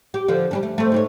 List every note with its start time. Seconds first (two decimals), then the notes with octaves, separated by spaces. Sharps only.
0.14 G4
0.28 D3 F3
0.51 G3 C#4 D4
0.63 A3
0.78 A3 C4
0.92 G#2 C4 C#5